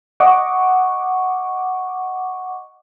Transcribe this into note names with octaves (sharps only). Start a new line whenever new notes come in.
D#5 F#5 C#6 D6